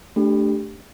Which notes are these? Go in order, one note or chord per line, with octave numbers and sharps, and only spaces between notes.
A3 D4 G4